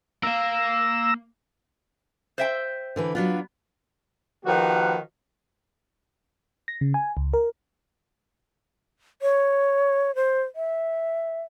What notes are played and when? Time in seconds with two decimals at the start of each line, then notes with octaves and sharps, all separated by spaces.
0.23 A#3 F5 A#5 E6
2.38 C5 E5 G5
2.96 D3 E3 B4
3.15 F#3 B3 D4 F4
4.45 D#3 F3 A#3 F#4 G4 B4
6.68 A#6
6.81 C#3
6.94 G#5
7.17 C#2
7.33 A#4
9.22 C#5
10.15 C5
10.56 E5